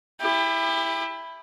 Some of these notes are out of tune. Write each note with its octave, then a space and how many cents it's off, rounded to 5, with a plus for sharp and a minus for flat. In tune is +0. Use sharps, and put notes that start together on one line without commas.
E4 +5 G4 +35